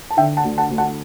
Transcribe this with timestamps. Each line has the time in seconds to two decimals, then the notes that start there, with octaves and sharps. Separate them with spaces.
0.10 A5
0.17 D3 E5 G5
0.37 F#5 A5
0.44 D2
0.58 F#5 A5
0.70 D2
0.78 F#5 A5